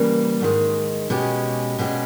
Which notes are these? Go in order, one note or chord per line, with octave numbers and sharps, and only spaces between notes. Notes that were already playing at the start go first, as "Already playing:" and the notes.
Already playing: C#3 E3 G3 A#3
G#2 D#3 G#3
B2 G#3 C#4 G4
B2 G#3 C#4 G4